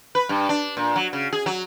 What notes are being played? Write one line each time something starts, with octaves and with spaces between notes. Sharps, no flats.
B4
G2
D4
A#2
F#3
C#3
G#4
F#3